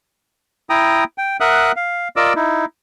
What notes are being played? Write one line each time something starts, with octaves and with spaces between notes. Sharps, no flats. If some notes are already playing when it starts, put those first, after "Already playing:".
E4 G5 A#5 D#6
G5
A#4 E5 F#5 D#6 F#6
F5
F4 A#4 D5 D#5 D6 E6
D#4 E4